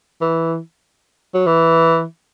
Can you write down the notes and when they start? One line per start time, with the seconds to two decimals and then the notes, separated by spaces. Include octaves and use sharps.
0.21 E3
1.35 F#3
1.47 E3